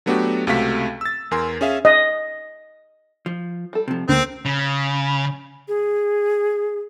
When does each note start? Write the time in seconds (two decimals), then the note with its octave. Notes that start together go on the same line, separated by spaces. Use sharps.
0.06 F#3 A3 B3 D4 F#4 G4
0.47 C#2 C3 A3 F#4 F5 B6
1.01 E6 A6
1.31 E2 A#4 G#5 C6
1.61 C#4 G#4 E5 F5
1.85 D#5
3.26 F3
3.73 G3 A4
3.88 C3 F3
4.09 D2 A#3 C4
4.45 C#3
5.68 G#4